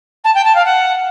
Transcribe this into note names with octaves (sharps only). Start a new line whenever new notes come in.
A5
G5
A5
F5
F#5